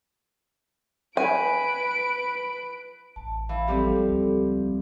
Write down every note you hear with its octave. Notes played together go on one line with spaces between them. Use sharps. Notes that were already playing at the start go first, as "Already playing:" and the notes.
B4 G#5 D7
A1 A5
E3 F5
F3 G3 C4 G4 A4
C#2